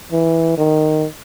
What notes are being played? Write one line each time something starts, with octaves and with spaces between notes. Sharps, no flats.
E3
D#3